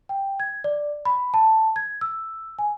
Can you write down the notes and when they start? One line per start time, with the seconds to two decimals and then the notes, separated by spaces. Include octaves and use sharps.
0.09 G5
0.40 G#6
0.64 D5
1.05 B5
1.34 A5
1.76 G#6
2.01 E6
2.59 G#5